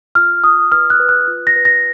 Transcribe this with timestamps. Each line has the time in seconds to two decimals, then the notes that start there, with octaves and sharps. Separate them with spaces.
0.15 F4 F6
0.43 F4 D#6
0.72 B4 F6
0.90 F#6
1.00 B4
1.09 F#6
1.27 F4
1.47 A#6
1.56 B4
1.65 A#6